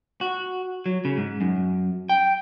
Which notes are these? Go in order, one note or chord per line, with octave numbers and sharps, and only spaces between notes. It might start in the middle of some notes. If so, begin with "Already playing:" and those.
F#4
F#3
C#3
G#2
F#2
G5